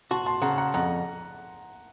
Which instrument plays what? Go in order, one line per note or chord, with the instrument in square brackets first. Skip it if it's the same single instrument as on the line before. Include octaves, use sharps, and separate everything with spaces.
[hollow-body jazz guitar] F#4 [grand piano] A5 C6
[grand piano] A5 C6
[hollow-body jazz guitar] C#3 [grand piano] F#5 A#5
[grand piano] F#5 A#5
[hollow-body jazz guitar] F2 [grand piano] F#5 A#5